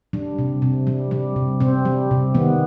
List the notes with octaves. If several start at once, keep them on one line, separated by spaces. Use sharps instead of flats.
G3 D4
C3
C3
G3
G3
C3
C3 C4
G3
C3
D#3 B3